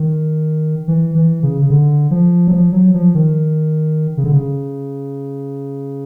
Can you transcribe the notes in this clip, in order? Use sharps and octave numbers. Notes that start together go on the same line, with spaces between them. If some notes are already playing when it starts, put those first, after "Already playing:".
Already playing: D#3
E3
E3
C#3
C#3
D3
F3
F#3
F3
F#3
F3
D#3
C#3
D3
C#3